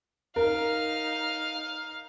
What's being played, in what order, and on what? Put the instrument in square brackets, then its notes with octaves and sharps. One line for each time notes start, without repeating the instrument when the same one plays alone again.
[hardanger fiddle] D#4 F5 [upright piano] A#4